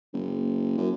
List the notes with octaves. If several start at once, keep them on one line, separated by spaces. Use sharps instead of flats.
F#1
F#2